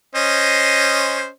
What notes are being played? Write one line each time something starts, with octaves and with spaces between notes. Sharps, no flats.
C#4 C5 D#5